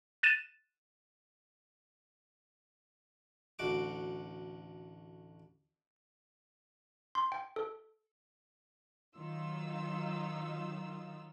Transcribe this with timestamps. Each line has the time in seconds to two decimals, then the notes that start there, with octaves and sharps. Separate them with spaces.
0.23 F#6 A6 D#7 E7
3.59 A1 D2 F#4 D6
7.15 C6
7.32 G5
7.56 A4
9.16 D#3 F#3 D#4 F4 E6